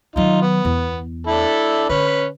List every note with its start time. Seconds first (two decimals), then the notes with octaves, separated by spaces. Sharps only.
0.16 D#3 F#3 D#4 F4
0.42 B3
0.65 E2
1.27 D4 E4 A4
1.89 D3 C#4 B4